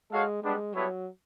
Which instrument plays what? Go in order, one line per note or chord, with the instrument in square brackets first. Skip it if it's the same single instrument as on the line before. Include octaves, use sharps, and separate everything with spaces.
[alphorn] G#3 [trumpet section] F#4 A4 C#5 F5
[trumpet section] G3 B3 D4 [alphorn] G#3
[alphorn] F#3 [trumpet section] G3 B3 E4 A4 C#5